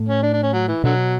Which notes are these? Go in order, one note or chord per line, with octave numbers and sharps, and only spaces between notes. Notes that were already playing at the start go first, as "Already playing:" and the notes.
Already playing: A2
C#4
D4
D4
C#4
F#3
E3
B2 D3 F#3